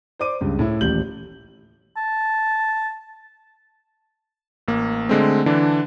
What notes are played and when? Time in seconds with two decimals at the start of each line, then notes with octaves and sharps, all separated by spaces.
0.19 C5 D5 D6 D#7
0.41 C#2 G2
0.59 A2 E4
0.81 D#1 A1 G6 F#7
1.97 A5
4.68 A1 A#3
5.09 D3 G#3 A3 C4
5.46 D3 E3 D4